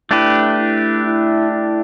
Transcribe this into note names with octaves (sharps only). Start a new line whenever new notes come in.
A3 D4 E4 G4 B4
E4
E4
E4